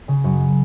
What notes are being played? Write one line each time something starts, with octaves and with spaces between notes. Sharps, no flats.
C#3
F#2